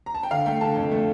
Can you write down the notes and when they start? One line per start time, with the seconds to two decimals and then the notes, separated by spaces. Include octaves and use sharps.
0.06 A#5
0.15 A5
0.23 G5
0.31 D3 F5
0.46 A3 G5
0.61 D3 A5
0.76 F2
0.91 A3